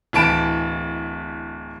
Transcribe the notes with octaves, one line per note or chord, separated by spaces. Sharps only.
D1 E3 A5 B5 D7 E7